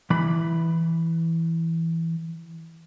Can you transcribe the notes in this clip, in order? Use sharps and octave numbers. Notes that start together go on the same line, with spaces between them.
E3 B5